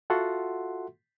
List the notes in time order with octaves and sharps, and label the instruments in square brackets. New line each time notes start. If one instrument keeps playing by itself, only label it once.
[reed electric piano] F4 F#4 A4 E5 F#5 C6